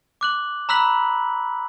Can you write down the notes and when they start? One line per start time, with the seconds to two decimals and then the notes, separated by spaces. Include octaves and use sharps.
0.21 D6 F#6 F#7
0.69 A#5 B5 E6 F#6 B6 F#7